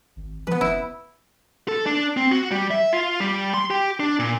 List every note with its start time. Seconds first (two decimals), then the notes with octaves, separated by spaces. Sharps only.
0.16 G#1
0.47 F3 B3 B4
0.61 F1 E4
1.68 A4
1.86 D4
2.17 C4
2.31 F#4
2.51 G3
2.71 E5
2.93 F4
3.20 G3
3.54 C6
3.70 G4
4.00 D4
4.19 A#2